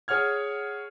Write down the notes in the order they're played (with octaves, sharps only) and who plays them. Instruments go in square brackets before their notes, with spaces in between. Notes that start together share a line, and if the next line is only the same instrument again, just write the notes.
[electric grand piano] G#4 C#5 F#5 F6 G#6